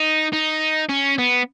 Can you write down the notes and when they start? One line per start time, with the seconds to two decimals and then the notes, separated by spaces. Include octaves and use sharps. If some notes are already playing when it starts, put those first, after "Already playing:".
Already playing: D#4
0.33 D#4
0.89 C#4
1.18 B3